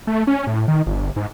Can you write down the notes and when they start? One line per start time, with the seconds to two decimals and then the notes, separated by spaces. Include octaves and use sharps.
0.07 A3
0.27 C#4
0.47 A2
0.68 D#3
0.87 G1
1.16 G#2